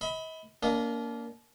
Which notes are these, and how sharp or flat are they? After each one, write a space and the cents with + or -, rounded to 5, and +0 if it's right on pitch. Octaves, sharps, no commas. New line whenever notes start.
D#5 +45 B5 +5
A#3 +0 D4 -35 D#5 -10